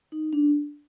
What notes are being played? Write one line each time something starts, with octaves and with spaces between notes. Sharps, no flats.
D#4
D4